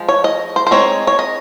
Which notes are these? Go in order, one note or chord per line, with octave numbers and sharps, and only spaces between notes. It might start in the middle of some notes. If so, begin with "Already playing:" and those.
Already playing: F3 G#3
C#5
D#5
C5
C5
G#3 C4 D#4 C#5
C#5
D#5